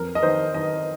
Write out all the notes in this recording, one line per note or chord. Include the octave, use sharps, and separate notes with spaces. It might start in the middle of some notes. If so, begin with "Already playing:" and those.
Already playing: F2 A#4
D#5
D#3 C5
D#3 D#5